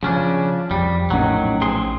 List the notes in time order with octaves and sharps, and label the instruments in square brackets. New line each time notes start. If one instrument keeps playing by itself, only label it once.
[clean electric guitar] C#3 C#4 D4 [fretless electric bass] F3
[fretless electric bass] F2 [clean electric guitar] G3
[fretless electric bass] A#1 A2 C#4 [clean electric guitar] D#3 F#3
[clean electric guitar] C4 G#4 C6